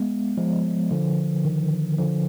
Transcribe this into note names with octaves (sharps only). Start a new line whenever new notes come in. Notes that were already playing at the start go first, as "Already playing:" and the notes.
Already playing: G#3 B3
F3 G#3
D3 F3
D#3
D3 F3